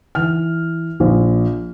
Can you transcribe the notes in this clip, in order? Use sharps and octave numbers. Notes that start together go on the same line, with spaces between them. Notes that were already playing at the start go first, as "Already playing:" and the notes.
E3 F6
A#1